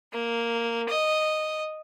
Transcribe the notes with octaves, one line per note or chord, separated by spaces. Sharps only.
A#3
D#5